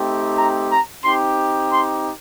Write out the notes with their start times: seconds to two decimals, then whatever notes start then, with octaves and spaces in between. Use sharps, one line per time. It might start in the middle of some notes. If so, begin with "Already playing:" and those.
Already playing: A3 C4 D#4 G4
0.37 A#5
0.71 A#5
1.04 C4 D#4 G4 C6
1.71 C6